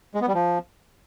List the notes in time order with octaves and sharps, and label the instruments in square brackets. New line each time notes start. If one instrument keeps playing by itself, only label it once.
[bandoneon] G#3
B3
G3
F3